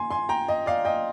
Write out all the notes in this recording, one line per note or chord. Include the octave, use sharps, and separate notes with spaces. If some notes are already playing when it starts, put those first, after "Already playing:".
Already playing: G#5 C6
G#5 C6
G5 A#5
D#5
D5 F5
D#5 G5